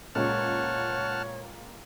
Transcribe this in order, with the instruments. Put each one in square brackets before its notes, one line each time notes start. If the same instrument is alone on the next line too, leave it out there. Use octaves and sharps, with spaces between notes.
[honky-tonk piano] C#2 A#2 G#3 [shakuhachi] C#5 [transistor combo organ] F#5 A5 F6